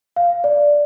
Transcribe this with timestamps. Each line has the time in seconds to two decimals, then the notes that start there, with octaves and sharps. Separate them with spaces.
0.16 F5
0.44 D5